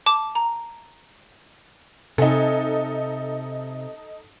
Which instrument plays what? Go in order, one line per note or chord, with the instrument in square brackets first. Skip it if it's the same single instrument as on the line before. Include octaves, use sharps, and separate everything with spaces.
[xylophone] A5 D6
A#5
[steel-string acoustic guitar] C3 G#5 [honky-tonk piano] D#4 A4